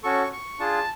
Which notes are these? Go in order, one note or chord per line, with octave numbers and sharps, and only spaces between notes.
C#4 F#4 A4 C#6
C#6
D4 F4 G#4 A5